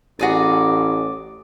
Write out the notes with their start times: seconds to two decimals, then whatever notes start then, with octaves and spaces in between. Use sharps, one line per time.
0.19 A1 F#4 G#4 D5